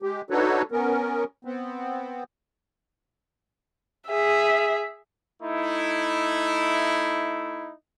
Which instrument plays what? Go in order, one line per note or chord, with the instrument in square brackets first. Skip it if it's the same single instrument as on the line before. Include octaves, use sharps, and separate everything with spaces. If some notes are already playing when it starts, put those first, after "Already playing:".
[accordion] G#3 G4
D4 D#4 F#4 A4 B4 C#5
B3 C#4 A#4
B3 C4
[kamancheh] G#4 E5
[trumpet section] A3 D#4 E4